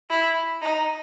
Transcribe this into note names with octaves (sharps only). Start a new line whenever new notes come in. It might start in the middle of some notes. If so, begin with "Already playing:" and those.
E4
D#4